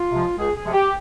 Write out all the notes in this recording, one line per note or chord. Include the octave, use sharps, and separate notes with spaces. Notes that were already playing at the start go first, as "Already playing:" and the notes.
Already playing: F4
C3 F3 G#3
C#2 G#4
G#4
C3 F3 G#3
G4